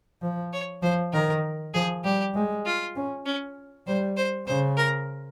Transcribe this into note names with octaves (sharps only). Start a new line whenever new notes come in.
F3
C#5
F3 C5
D#3 A#4
F3 G#4
G3 G4
G#3
F4
C#4
C#4
G3 C5
C5
C#3 C5
A#4